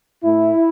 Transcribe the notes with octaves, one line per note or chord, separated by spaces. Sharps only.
A2 A3 E4